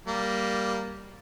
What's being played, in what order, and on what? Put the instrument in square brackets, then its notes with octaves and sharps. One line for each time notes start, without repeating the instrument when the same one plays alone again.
[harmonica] G3 A#3